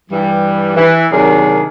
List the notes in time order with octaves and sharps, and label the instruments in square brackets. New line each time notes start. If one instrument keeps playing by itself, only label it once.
[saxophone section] G2 E3 G3
E3
C3 D#3 F#3 D4 G#4 A#4